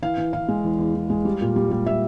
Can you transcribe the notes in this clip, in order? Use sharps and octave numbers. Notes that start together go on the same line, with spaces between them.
E3 F5
E3
E3 F5
G#3
E2
E2
E2
G#3
G3
A#2
G3
G3
G3 E5